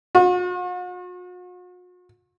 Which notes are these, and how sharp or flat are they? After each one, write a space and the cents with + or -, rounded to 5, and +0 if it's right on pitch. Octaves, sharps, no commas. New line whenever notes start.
F#4 -45